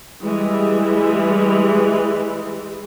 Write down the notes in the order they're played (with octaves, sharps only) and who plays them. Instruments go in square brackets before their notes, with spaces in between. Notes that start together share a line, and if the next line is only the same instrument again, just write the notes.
[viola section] E3 G3 G#3